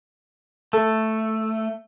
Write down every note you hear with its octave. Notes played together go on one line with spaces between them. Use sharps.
A3 A4